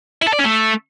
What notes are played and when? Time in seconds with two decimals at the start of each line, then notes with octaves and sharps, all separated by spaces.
0.22 E4
0.28 A4
0.33 D5
0.39 C#4
0.45 A3